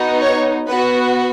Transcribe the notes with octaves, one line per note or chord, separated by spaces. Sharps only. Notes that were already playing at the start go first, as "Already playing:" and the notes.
Already playing: B3 D#4 F#4
C#5
B3 F#4 B4